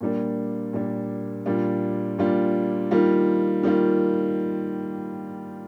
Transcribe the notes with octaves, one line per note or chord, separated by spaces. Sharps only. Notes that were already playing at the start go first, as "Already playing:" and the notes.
A#2 G3 A#3 D4
A#2 G3 A#3 D4
A#2 G3 D4 F4
A#2 G3 D4 F4
D#3 G3 A#3 F4
D#3 G3 A#3 F4